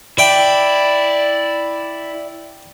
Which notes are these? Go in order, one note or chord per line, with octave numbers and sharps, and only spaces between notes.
E4 D5 G5 B5